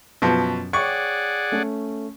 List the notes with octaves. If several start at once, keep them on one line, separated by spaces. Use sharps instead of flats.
F#2 B2 F3
G#4 C#5 D5 F#5 G5 C#6 D6
A3 C#4